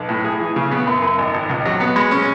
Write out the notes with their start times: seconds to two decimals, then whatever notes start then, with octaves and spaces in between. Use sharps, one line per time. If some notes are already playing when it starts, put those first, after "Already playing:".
Already playing: B1
0.09 A2
0.24 G#4
0.40 E3
0.56 C#3
0.71 B3
0.87 F#2
1.02 F#2
1.18 G#1
1.34 G#1
1.49 C#2
1.65 F#3
1.80 B3
1.96 G#3
2.11 C#4